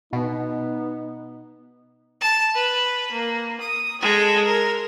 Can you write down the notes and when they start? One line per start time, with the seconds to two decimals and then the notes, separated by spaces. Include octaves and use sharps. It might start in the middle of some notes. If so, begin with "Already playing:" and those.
0.13 B2 B3 D#4
2.21 A5
2.55 B4
3.12 A#3
3.60 D#6
4.01 G#3 A4
4.45 A#4